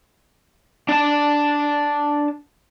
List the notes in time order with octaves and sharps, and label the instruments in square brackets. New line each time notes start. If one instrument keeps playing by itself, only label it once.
[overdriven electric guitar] D4 A5